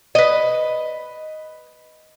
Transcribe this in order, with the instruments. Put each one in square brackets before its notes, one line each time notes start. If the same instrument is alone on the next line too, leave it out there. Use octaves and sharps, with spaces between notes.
[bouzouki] B4 D#5